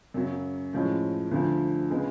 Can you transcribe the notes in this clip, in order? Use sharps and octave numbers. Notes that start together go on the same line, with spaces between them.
F#2 C#3 F#3
A2 F3 G#3 C#4
D2 D3 F3
C#3 G#3 B3